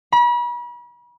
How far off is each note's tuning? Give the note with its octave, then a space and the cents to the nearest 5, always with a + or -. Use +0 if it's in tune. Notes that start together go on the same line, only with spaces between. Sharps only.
B5 -40